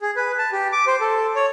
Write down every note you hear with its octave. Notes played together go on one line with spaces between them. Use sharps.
G#4
B4
A5
G4
D6
C5
A4
C#5